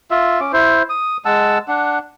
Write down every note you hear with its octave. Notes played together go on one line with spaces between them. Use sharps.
F4 E5
C#4 D6
E4 C5
D#6
G#3 F#5 A5 E6
D4 F#5